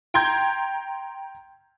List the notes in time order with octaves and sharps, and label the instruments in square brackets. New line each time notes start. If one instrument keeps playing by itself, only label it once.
[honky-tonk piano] G5 A#5 C6 G6 G#6